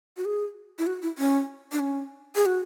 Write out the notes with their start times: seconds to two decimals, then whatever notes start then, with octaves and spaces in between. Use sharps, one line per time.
0.17 F#4
0.25 G#4
0.79 E4
0.87 F#4
1.02 E4
1.18 C#4
1.72 D4
1.79 C#4
2.35 G#4
2.46 F#4